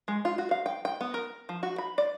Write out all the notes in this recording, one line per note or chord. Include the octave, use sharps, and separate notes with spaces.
G#3
F4
F#4
F5
G5
G5
B3
A#4
F3
F#4
B5
D5